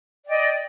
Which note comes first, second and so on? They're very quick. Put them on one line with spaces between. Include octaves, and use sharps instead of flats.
D5 G5 D#5